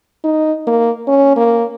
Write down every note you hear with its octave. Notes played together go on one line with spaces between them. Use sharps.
D#4
A#3
C#4
A#3